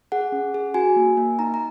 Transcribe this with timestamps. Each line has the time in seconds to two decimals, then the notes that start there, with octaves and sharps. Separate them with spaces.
0.12 G#4 F#5
0.32 C#4
0.54 G#4
0.74 F#4 G#5
0.96 A#3
1.17 A#3
1.39 D#4 A#5
1.54 A#5